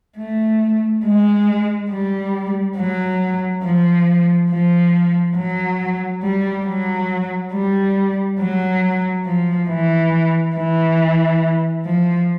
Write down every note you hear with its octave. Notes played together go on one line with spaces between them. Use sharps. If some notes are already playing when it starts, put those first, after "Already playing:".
A3
G#3
G3
F#3
F3
F3
F#3
G3
F#3
G3
F#3
F3
E3
E3
F3